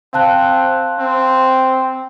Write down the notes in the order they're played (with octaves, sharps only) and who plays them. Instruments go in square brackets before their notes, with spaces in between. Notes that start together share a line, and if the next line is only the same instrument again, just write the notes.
[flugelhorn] C4 [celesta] F5 A5 F#6
[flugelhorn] C4